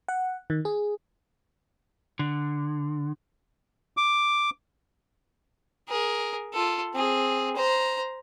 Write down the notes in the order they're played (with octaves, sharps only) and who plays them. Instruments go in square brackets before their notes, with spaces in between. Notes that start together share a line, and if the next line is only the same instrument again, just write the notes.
[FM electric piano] F#5
D#3
G#4
[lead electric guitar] D3
[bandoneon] D6
[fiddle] G#4 A#4
F4 A4
C4 G#4
C5 A#5